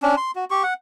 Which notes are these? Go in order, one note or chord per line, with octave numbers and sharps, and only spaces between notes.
C#4 D4
C6
F#4
G4 C#6
F#5